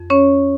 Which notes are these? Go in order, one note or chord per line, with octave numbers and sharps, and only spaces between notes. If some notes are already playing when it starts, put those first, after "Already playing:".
Already playing: F2
C#4 C#5